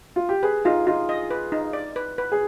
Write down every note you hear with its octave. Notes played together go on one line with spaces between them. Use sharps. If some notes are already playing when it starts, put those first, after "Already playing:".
F4
G4
G#4 B4
D#4 F4
D#4 F4
D#5
B4
D#4
D5
B4
B4
G#4